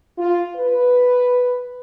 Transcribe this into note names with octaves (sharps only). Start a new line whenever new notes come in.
F4
B4